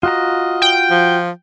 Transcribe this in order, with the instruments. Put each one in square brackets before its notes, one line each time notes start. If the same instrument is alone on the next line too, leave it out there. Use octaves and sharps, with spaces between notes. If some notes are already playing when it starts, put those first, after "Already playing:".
[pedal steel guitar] F4 F#4 A#5 [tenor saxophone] D#5
[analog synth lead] G5
[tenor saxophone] F3